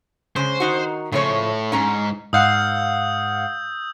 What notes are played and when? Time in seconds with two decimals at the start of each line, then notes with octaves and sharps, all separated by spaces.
0.36 C#3 G#3 C#4 C5
0.60 D#3 D#4 F#4
1.12 A2 C#3 F3 C#5
1.72 G#2 C#4 A#5
2.33 G#2 F5 F#5 D#6 E6 G6